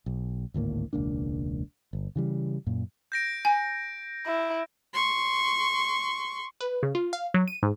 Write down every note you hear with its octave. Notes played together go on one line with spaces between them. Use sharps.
B1
G#1 D2 A2 A#3
E1 C#2 A#3 D4
G1
C#3 E3 G3
F#2 A#2
G6 A#6 D7
G#5
E4
C6 C#6
B4
C#3
F4
F5
F#3
D#7
G#2